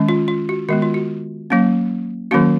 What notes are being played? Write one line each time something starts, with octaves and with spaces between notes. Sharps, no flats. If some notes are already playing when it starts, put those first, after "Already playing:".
Already playing: D#3 G#3 C#4
F4
F4
F#4
D#3 G#3 B3 F#4
F4
F#4
F#3 A#3 C#4
D#3 F#3 A#3 C#4 F#4